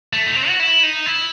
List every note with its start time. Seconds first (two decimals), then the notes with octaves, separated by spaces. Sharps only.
0.13 A3
0.26 D#4
0.36 C4
0.48 F#4
0.60 E4
0.83 D#4
1.06 E4